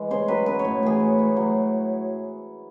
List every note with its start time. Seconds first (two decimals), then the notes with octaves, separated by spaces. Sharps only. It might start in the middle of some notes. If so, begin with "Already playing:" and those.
Already playing: E3 G#3
0.11 C#3 C5
0.28 F#3 B4
0.46 B3 B4
0.59 C#5
0.65 A2
0.83 E3 G#4
1.00 A2
1.19 A2
1.37 F#3